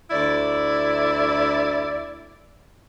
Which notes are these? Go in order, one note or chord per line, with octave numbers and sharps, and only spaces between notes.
D2 E4 D5